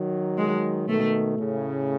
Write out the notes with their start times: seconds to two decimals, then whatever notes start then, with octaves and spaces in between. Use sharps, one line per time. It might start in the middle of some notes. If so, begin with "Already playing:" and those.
Already playing: D#3 F#3
0.38 G#3
0.88 B2 D#3 A3
1.38 A2 C#3